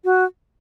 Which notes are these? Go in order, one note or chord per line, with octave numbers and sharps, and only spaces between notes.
F#4